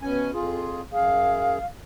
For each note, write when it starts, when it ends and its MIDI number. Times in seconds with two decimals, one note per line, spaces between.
0.02 0.31 47
0.02 0.31 61
0.02 0.31 80
0.34 0.81 41
0.34 0.81 65
0.34 0.81 68
0.92 1.58 42
0.92 1.58 68
0.92 1.64 77